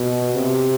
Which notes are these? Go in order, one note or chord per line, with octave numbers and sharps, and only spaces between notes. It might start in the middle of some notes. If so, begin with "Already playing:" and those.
Already playing: B2
C3